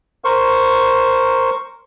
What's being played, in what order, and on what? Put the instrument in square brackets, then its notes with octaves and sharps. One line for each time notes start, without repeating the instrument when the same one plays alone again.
[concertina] A#4 C5 C#6